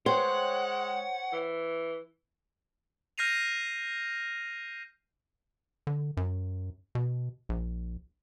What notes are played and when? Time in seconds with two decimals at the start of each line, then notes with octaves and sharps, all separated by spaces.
0.06 G#3 C5 C#5 F#5 G5
1.32 E3
3.18 F6 G6 A#6 C7 D#7 F7
5.87 D3
6.17 F#2
6.95 B2
7.49 A#1